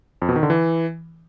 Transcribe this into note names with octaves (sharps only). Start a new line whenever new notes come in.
F2
B2
D#3
D3
E3